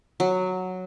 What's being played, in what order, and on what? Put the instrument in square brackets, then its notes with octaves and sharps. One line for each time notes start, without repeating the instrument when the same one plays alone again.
[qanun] F#3